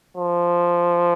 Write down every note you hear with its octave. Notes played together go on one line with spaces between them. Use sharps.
F3